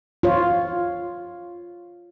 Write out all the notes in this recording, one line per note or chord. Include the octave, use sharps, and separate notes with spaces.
F4 C#5